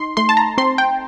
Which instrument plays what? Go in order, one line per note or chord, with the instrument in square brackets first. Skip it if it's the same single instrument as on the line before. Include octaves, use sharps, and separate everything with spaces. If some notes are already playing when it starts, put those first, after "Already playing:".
Already playing: [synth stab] D#4 C6
A3 C6
A5
A#5
C4 C6
G5